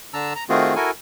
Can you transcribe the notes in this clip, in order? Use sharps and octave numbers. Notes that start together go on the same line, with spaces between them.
D3 D4 A5 A#5 E6
A#5
D#3 A3 C4 F4 F#4 G#4
E4 F#4 A4 A#4 G#5